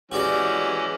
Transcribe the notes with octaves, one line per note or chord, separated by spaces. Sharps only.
E3 G#3 C#4 F#4 G4 D5